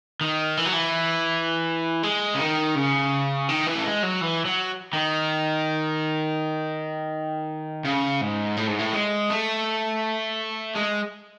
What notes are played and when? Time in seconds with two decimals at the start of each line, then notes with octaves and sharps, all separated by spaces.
0.21 D#3
0.57 E3
0.66 F#3
0.73 E3
2.03 G#3
2.34 C#3
2.39 D#3
2.75 C#3
3.49 D#3
3.66 E3
3.76 A3
3.84 G#3
4.03 F#3
4.21 E3
4.45 F#3
4.93 D#3
7.85 C#3
8.21 G#2
8.57 A2
8.68 G#2
8.79 A2
8.93 G#3
9.30 A3
10.75 G#3